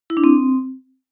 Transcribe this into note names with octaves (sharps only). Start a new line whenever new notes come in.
E4
D4
C4